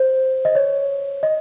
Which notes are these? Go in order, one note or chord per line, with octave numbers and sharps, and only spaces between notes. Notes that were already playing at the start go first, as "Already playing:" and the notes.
Already playing: C5
D#5
C#5
D#5